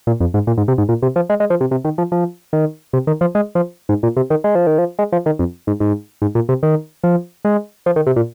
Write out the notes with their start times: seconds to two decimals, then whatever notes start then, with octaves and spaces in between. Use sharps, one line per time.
0.07 A#2
0.20 F2
0.34 G#2
0.47 A#2
0.58 G#2
0.68 C3
0.78 G#2
0.89 A#2
1.02 C3
1.16 F3
1.30 G#3
1.40 G#3
1.50 F3
1.61 C3
1.71 C3
1.85 D#3
1.98 F3
2.12 F3
2.53 D#3
2.93 C3
3.07 D#3
3.21 F3
3.35 G#3
3.55 F3
3.89 G#2
4.03 A#2
4.17 C3
4.30 D#3
4.44 G#3
4.55 F3
4.67 D#3
4.78 F3
4.99 G#3
5.12 F3
5.26 D#3
5.39 F2
5.67 G#2
5.80 G#2
6.22 G#2
6.35 A#2
6.49 C3
6.63 D#3
7.04 F3
7.45 G#3
7.86 F3
7.96 D#3
8.07 C3
8.16 A#2